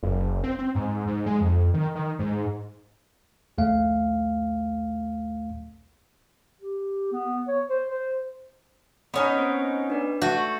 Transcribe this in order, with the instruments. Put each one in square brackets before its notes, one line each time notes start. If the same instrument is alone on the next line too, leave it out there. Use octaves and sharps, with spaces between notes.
[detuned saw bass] F#1
C4
C4
G#2
G#2
G#3
F2
D#3
D#3
G#2
[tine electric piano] A#1 D#2 A3 F5
[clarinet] G4
B3
C#5
C5
C5
[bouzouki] B3 C#4 D#4 [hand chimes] B5 D#6
[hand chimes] C4 C5 D7
D4 B4 D5
[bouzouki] A3 [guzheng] F#4 [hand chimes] G6